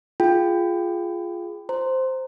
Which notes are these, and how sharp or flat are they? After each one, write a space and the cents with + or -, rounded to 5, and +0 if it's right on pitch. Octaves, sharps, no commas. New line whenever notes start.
F4 -5 G#4 +0 G5 +0
C5 +0 A#5 -10